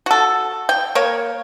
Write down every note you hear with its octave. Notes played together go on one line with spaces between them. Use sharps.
F#4 A4
G5
A#3 C#5